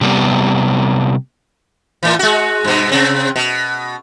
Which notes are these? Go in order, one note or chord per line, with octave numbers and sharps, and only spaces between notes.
C3 G3 B3
A2 E3
G#3 F#4
G2 B2
C3 C4
B2